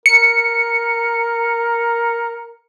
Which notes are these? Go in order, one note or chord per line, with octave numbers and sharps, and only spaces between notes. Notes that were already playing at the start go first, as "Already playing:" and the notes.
A#4 C#7